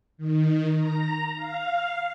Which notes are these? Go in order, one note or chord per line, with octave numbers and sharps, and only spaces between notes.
D#3
A#5
F5